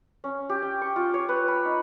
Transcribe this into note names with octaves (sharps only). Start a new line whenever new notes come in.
C#4
G4
G5
C#6
F4
C#5
B4
B5
D#4